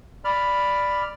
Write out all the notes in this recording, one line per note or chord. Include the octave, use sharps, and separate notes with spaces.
D5 B5 F6